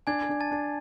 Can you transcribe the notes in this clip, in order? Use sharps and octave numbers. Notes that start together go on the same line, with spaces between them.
D4 G#5 G#6
D4
A5 A6
D4